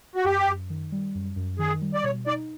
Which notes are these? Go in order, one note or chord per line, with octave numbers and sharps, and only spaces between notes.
F#4
F#2 G4
F#2
D#3
G3
F#2
F#2
D#3 G#4
G3
D5
B2 C#5
D#4 D5